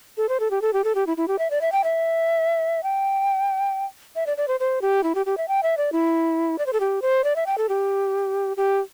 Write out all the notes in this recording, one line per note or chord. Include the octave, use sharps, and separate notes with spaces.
A4
C5
A4
G4
A4
G4
A4
G4
E4
E4
G4
E5
D5
E5
G5
E5
G5
E5
D5
D5
C5
C5
G4
E4
G4
G4
E5
G5
E5
D5
E4
D5
C5
A4
G4
C5
D5
E5
G5
A4
G4
G4